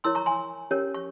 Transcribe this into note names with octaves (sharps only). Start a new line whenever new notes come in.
E4 A#4 C#5 C6 E6
A#5 C#6
G#5 C6
C#4 G4 A#4 C#5
C#6